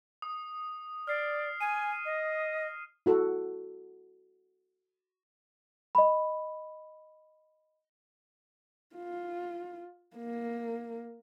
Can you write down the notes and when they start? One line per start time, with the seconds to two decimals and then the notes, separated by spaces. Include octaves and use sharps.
0.22 D#6
1.07 D5 F6 C7
1.61 G#5 D#7
2.05 D#5
3.06 E4 F#4 A4
5.95 D#5 B5
8.96 F4
10.17 A#3